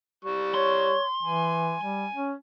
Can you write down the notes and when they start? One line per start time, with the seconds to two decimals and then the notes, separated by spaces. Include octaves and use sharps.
0.25 G3 C#6
0.54 C#5 C6
1.23 E3 G#5
1.80 G3
2.15 C#4